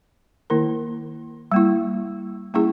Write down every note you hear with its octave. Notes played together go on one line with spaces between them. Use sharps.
D#3 A#3 E4 A#4
G3 A#3 E4
G3 A#3 C#4 E4 G#4